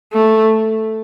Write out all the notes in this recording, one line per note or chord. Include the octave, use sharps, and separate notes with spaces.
A3